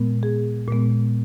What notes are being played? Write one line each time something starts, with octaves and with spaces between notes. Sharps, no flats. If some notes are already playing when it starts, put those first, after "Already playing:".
Already playing: A#2 G#3 B3
G#4
A#2 G#3 B3